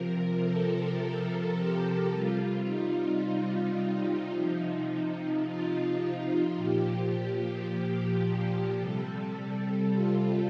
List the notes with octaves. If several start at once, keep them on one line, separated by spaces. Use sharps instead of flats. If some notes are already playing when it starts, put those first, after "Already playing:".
Already playing: C3 F3 A#4
A4
A4
G4
C3 G3 F4
D#4
C3 F3 D#4
D#4
F4
F4
A#2 F3 G4
G4
C3 G3 A4
A4
F4